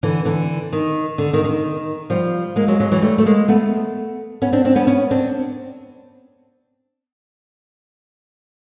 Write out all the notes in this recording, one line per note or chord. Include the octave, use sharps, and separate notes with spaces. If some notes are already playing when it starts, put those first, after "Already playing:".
D3 E3
D3 E3
D#3
D3
D#3
D3
D#3
F3 G3
G#3 A#3
F#3 G#3
F#3 G#3
E3 F#3
G3 A3
A3
G#3 A#3
A3 B3
B3 C#4
C4 D4
C4 D4
B3 C#4
B3 C#4
C4 D4